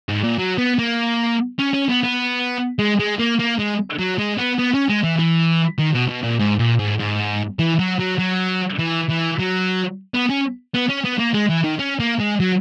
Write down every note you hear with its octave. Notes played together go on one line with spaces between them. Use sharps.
G#2
A#2
F#3
B3
A#3
C#4
C#4
B3
B3
G#3
G#3
A#3
A#3
G#3
F#3
G#3
B3
B3
C#4
G#3
E3
E3
D#3
B2
B2
A#2
G#2
A#2
G#2
G#2
E3
F#3
F#3
F#3
E3
E3
F#3
B3
C#4
B3
C#4
B3
A#3
G#3
E3
D#3
C#4
A#3
G#3
F#3